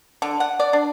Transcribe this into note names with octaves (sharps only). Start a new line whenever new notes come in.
D3
F#5
D5
D4